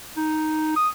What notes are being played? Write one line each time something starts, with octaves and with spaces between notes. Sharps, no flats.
D#4
D#6